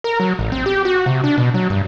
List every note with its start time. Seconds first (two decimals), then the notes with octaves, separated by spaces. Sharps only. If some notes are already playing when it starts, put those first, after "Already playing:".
0.04 A#4
0.20 F#3
0.39 A1
0.52 C4
0.66 G4
0.85 F#4
1.06 C3
1.24 D4
1.38 B2
1.54 F#3
1.70 G2